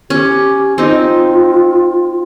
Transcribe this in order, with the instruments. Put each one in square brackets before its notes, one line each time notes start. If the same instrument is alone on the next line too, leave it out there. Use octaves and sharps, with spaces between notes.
[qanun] C#4 [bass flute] G4
[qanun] C4 D#4 [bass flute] F4